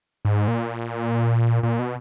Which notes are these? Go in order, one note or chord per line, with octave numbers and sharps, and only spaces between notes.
G#2
A#2
A#2
B2